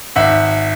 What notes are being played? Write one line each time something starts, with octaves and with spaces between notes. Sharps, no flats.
G#1 E5 F#5